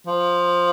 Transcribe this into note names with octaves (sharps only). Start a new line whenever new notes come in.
F3